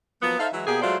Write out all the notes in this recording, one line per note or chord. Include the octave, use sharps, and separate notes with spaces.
F3 F#3 A#3 B3
D#4 A4 C5 E5 F5
E3 F#3 G#3 E4
B2 A#3 G4 G#4
F#3 G#3 A3 F4 C5 D5